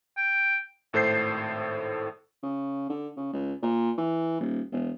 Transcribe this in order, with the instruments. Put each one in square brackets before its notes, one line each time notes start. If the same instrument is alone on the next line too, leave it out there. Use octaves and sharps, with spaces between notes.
[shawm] G5
[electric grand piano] G#1 A2 A4 C5 G6 C7
[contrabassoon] C#3
D3
C#3
C#2
A#2
E3
D#1
E1